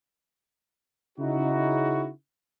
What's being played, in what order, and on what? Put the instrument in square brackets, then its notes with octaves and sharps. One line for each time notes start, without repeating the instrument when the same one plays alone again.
[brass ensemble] C#3 D#4 E4 F#4